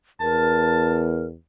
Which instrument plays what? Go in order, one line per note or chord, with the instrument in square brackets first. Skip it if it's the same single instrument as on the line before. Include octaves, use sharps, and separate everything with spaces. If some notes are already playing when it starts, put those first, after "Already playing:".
[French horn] E2 [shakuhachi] A#4 [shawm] A5